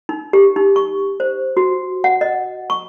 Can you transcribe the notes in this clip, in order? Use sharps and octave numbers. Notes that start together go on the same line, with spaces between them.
D#4
G4
D#4
C#6
C5
F#4
F#5
D#5
C#6